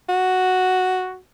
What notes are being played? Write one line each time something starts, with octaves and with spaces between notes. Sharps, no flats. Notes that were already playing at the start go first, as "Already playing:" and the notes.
F#4